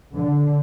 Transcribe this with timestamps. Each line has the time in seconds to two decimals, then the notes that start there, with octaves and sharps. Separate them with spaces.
0.14 D3